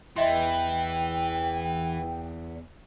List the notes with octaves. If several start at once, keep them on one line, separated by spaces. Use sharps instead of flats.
E2 E3 D#5 E5 G5 C6